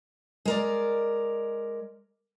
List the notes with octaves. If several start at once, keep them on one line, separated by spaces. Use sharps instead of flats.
G#3 A#4 D5